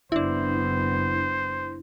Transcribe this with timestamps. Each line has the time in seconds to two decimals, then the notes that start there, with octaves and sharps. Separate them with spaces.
0.12 F#1 B3 D4 E4 C5